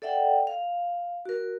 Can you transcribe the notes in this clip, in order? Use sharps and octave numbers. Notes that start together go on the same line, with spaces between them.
A4 D5 E5 F#5 G5
F5
F#4 A#4